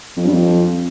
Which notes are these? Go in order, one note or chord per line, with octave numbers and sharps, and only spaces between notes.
F2
G2
F2